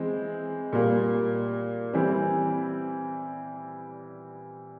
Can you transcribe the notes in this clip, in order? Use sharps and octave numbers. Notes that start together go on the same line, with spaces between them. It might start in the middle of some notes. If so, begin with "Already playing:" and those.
Already playing: E3 G#3 C4
A#2 G3 A#3
E3 G3 C4